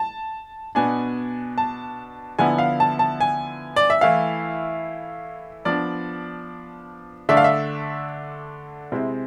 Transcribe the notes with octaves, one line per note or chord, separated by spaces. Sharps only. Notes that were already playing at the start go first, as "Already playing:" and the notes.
Already playing: A5
B2 B3 D4 G#5
A5
D3 F3 B3 E4 G#5
F5
A5
A5
G#5
D5
E5
E3 A3 E4 F5
F3 B3 D4 D5
D3 A3 D4 E5
F5
E5
C3 G#3 C4 E4